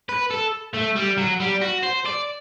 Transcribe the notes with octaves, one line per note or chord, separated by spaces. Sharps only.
B4
A4
A3
G3
F#3
G3
F#4
C5
D5